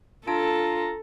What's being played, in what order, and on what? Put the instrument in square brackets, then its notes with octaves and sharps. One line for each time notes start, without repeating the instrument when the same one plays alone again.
[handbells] D4 A5 D7 [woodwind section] F4 [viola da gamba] A4 [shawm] A#5